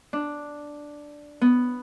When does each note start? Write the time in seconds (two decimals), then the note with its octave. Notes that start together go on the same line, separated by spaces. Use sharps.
0.13 D4
1.41 B3